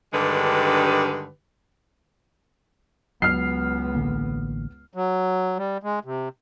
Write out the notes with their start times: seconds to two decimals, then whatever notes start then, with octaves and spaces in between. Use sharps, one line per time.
0.13 G2 D3 D#3 G#3 G4 B4
3.22 C#2 F#3 B3 F6 C7
3.95 A1 D3 A#3
4.94 F#3
5.58 G3
5.83 G#3
6.05 C3